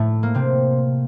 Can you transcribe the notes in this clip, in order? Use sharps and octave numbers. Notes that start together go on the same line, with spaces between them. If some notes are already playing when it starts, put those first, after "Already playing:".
Already playing: A2 A3
A#3
C3 C4